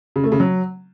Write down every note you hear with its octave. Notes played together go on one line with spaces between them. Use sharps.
C#3
A3
C#3
F#3